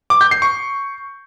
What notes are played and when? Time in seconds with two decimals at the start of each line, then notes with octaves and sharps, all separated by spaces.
0.10 D6
0.21 G6
0.31 C7
0.42 C#6